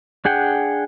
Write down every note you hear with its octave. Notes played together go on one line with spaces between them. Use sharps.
D4 G#4 F#5 G5